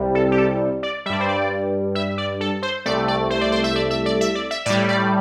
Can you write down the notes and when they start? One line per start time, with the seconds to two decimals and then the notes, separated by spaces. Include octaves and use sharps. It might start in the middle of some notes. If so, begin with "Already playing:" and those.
Already playing: C2 C3 G3
0.15 A4
0.32 G4
0.38 A4
0.83 D5
1.06 G3 E5
1.10 G2 D5
1.21 C5
1.29 D5
1.95 E5
2.18 D5
2.41 A4
2.63 C5
2.86 C2 C3 A3 D5
3.08 D5
3.30 C5
3.41 D5
3.52 C5
3.64 E5
3.76 D5
3.91 E5
4.06 D5
4.21 E5
4.35 D5
4.51 E5
4.66 A2 G3 D5
4.89 D5